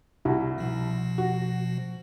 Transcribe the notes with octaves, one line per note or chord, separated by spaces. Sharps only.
C2 E4 F#4
B2 F3
F#4